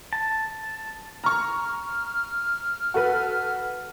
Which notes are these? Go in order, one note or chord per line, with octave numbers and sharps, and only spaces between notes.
A5
A#5 C#6 F6
F#4 A4 B4